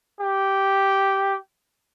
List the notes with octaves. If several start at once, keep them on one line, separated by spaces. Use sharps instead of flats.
G4